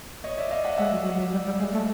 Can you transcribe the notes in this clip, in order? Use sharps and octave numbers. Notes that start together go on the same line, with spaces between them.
C#5 D#5
D5 E5
D#5 F5
E5 F#5
G#3 E5 F#5
F#3
F#3
F#3
G3
G3
G#3
A3